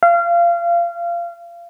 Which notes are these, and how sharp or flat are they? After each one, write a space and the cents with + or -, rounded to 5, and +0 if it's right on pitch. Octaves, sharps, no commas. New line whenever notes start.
F5 -25